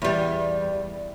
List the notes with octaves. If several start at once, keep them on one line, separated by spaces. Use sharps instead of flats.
E2 G3